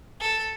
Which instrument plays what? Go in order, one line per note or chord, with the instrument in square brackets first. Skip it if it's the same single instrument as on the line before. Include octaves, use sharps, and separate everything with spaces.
[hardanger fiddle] A4